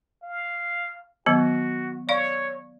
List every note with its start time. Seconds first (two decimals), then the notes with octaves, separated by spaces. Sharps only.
0.23 F5
1.26 D#3 F#3 B3 F#4
2.09 C#5 D5 F5